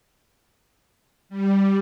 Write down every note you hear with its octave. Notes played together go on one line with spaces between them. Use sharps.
G3